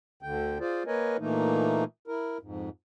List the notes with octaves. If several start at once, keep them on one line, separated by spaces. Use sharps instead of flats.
D2 D3 G5
F4 G#4 C5 D5
A#3 A#4 B4 C#5 D#5 G#5
A#2 E3 A3 A#3 D#4
E4 A#4
F2 G#2